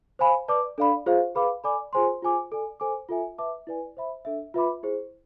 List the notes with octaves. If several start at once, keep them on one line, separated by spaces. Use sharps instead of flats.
C5 F5 G#5 B5
B4 D5 A5 D6
D4 A4 D5 F5 B5
F4 G#4 C5 F5
G#4 B4 F5 B5 D6
A4 D5 G#5 B5 D6
F4 G#4 C5 G#5 C6
F4 G#4 C5 G#5 D6
A4 D5 G#5
A4 C5 G#5 D6
F4 A4 E5 G#5
B4 E5 A5 D6
E4 B4 D5 G#5
C5 E5 B5
D4 A4 E5
F4 B4 E5 B5 D6
E4 G#4 C5